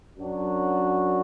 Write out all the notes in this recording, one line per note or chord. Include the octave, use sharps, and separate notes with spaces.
F#2 F#3 D4 F#4